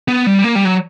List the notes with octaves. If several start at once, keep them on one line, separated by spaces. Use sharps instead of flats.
B3
G3
A#3
G3
F#3